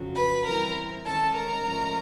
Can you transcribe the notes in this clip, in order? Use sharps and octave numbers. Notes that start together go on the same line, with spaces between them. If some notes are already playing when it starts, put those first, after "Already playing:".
Already playing: F2 C#3 F#3
B4 B5
E3 G3 C4 E4 A#4 A#5
D#3 G#3 C#4 A4 A5
A#4 A#5
A2 F3 G#3 C#4